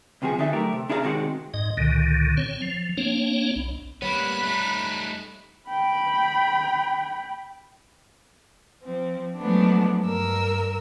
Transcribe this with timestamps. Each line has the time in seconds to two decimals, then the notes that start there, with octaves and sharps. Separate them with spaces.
0.22 C#2 C3 F3 F#4 G#4
0.38 D3 D4 D#4 A4 E5
0.53 F#2 A3 G4 A#4
0.73 C3
0.89 D4 E4 G#4 A4 F5 A#5
1.03 C3 D#3 G#3 F#4
1.54 G#2 D#5
1.77 C#2 A#2 D3 D#3
2.37 C4 C#5
2.62 F3
2.97 A#3 C4 D4 C#5
3.56 B1
4.02 G3 A#3 B3 C#5 B5 F#6
4.42 A3 D#4
5.69 G5 B5
8.83 F3 C4
9.38 F3 F#3 G#3 A3 B3 D4
10.03 G2 A#4 E6